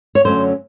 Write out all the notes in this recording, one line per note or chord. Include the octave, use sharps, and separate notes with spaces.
C#5
F#2 D3 F#3 A3 C#4 C5